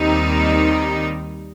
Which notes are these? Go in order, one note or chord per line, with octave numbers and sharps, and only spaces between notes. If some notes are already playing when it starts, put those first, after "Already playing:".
Already playing: D#2 D#3 G3 C4 D#4